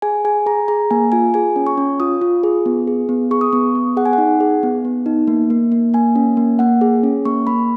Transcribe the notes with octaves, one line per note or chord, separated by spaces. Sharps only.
G#4 G#5
G#4 G#5
G#4 A#5
G#4 A#5
A#3 G#5
F4 G#5
G#4 G#5
C#4
C#6
C#4
F4 D#6
F4
G#4
B3
G#4
B3
G#4 C#6
D#6
B3 C#6
B3
G#4 F#5
G#5
D#4 F#5
G#4
B3
B3
D#4
A#3
A#3
A#3
A#3 G#5
C#4
A#3
A#3 F#5
G#4
C#4
A#3 C#6
A#3 B5